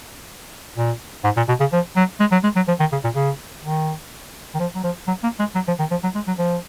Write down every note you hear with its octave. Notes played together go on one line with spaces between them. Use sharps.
A#2
G#2
A#2
B2
C#3
F3
F#3
G#3
F#3
G#3
F#3
F3
D#3
C#3
A#2
C#3
D#3
D#3
F3
F#3
F3
F#3
A#3
G#3
F#3
F3
D#3
F3
F#3
G#3
F#3
F3